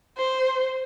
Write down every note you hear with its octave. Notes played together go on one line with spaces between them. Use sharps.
C5